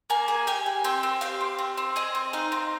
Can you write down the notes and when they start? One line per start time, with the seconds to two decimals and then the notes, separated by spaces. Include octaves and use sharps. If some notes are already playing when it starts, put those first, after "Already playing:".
0.10 A#3 G#5
0.28 G#4
0.47 G4 G#5
0.66 G4
0.84 C4 G5
1.03 C4
1.21 G4 F5
1.41 C4
1.59 C4
1.78 C4
1.96 G#4 D#5
2.15 C4
2.33 D#4 F5
2.52 C4